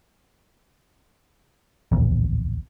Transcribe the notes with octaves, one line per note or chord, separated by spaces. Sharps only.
D1 A#1 E2